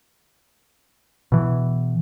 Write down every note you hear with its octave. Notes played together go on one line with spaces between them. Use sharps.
B2 E3